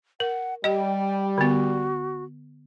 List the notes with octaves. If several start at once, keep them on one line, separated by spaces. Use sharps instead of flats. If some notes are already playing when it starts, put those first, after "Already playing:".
A#4 F#5
G3 G4 D#5 G5
D3 B3 F#4